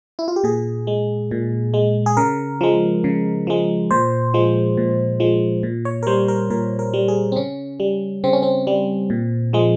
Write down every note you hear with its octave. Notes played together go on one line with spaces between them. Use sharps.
E4
F4
G4
A#2 G#4
G#3
A#2
G#3
G#4
C#3 A#4
F3 G#3
C#3
F3 G#3
A#2 C5
F3 G#3
A#2
F3 G#3
A#2
C#5
A#4
G3 C5
A#4
A#2 A#4
A#4
G3
G#4
C4
C#3 C#4
G3
C#3 C4
C#4
C4
G3
A#2
F3 G#3